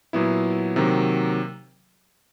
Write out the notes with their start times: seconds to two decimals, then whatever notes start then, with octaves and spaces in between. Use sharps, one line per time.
0.13 A#2 F#3 B3 E4
0.76 C3 D#3 F#3 A#3